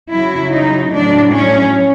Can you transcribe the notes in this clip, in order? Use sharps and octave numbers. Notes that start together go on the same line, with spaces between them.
C#3 F#3 E4
D#4
A2 F#3 D4
C#4